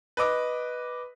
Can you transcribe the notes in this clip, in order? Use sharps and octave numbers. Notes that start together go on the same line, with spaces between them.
B4 D#5 D6